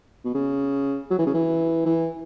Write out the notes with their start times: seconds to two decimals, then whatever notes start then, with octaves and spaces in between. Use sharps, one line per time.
0.25 B2
0.34 C#3
1.10 F#3
1.18 E3
1.26 C#3
1.34 E3
1.85 E3